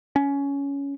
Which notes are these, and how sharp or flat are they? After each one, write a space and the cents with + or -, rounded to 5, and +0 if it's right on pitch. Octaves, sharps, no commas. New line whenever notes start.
C#4 +15